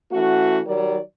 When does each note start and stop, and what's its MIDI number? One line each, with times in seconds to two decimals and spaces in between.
0.12 0.59 52
0.12 0.59 57
0.12 0.59 61
0.12 0.59 66
0.67 0.98 51
0.67 0.98 54
0.67 0.98 55
0.67 0.98 70
0.67 0.98 74